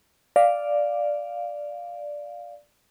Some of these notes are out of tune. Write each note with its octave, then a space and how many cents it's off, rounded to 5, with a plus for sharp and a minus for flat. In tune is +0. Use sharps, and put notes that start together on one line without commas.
D5 +0 F5 +0